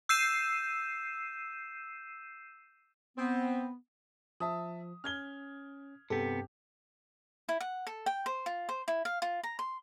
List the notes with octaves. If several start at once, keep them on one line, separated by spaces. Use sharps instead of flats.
E6 G6 C7 D#7 E7
B3 C4
F3 E5 A5 D#6
C#4 F6 G#6 G7
G2 C3 B3 C4 G4 A4
E4
F#5
A4
G5
C5
F4
C5
E4
F5
F4
A#5
C6